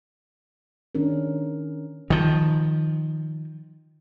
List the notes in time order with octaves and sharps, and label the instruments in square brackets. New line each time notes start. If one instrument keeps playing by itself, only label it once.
[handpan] D#3 C#4 D4 A#4
[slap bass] D#3 F3